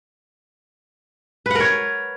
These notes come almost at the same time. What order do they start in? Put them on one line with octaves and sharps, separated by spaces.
B4 F#5 A#4 C#5